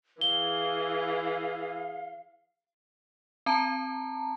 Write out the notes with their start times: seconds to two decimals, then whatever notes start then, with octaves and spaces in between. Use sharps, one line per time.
0.21 E3 G#4 F5 G7
3.46 C4 A5 A#5